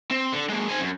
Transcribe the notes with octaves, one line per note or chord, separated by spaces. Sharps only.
C4
D3
G#3 A#3
C4 G#5
F#2